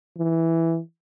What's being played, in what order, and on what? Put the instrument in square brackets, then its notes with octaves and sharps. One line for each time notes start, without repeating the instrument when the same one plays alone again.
[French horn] E3